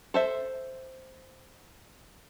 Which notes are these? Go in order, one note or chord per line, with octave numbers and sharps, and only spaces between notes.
A4 C5 E5